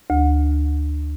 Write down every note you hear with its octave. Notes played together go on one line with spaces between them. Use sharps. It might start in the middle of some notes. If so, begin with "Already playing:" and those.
D2